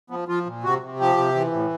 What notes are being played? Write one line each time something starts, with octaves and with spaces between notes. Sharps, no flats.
F3 B3
F3 F4
A#2
C3 F#4
C3
F3 G4
C3
E3
A2